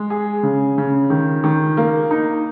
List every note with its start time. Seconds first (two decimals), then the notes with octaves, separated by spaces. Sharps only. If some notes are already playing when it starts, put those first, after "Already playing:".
Already playing: G#3
0.10 G#4
0.43 C#3
0.78 C#3
1.10 D#3
1.44 D#3
1.77 A#3
2.11 D#4